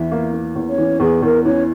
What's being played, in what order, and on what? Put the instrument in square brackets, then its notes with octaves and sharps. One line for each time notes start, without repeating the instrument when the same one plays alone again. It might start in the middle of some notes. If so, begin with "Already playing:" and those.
Already playing: [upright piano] E2 E3 [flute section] E4 E5
[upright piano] A#3
A#3
E2
[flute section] C#4 C#5
[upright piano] E3
[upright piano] E2 [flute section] G#4
[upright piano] E2 [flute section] A#4
[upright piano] E3 [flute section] C#4 C#5